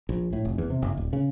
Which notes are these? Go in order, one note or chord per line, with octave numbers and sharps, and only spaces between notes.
A#1
A2
F1
E2
C3
F#1
D1
C#3